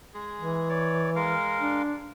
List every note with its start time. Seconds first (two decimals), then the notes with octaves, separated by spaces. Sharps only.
0.14 G#3 G#4
0.41 E3
0.69 C#5 D5
1.16 G#3 A#4 F5
1.60 D4